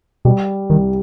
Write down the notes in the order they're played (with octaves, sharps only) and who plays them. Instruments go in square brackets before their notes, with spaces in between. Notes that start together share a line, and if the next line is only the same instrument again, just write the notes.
[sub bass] B2 [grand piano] G3
[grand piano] C2 [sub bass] D#3